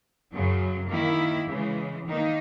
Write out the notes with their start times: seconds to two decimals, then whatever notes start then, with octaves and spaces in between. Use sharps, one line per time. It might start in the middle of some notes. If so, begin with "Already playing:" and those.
0.33 F#2 C#3 F#3
0.91 D#3 A#3 E4
1.49 C#3 E3 G#3
2.08 D#3 A#3 D#4